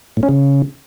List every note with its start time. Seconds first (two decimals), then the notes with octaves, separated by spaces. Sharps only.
0.17 A2
0.23 C#4
0.29 C#3